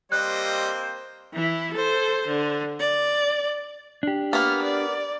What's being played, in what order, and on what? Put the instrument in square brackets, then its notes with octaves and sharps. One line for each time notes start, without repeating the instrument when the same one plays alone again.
[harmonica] G3 D#5 [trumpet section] A#3 C4 C5 [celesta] F#6
[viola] E3 E4
A4 C5
D3
D5
[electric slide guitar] D4 G4
[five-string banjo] A#3 B3 [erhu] F6
[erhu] D5